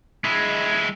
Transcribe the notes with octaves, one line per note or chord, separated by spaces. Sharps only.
G#3 E4